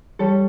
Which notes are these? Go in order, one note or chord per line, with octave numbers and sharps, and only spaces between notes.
G3 A4 C#5